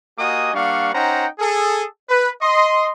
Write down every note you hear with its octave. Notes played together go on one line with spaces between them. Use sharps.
A#3 F#4 G4 D#5 G#5 D#6
G3 A#3 D4 F5 F#5 C#6
C#4 D#4 C5 F#5 G5 A#5
G#4 A4
B4
D#5 C6